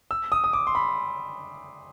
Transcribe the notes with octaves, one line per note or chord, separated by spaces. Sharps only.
E6
D#6
D#6
D6
C6
B5